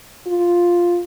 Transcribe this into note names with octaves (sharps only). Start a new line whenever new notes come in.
F4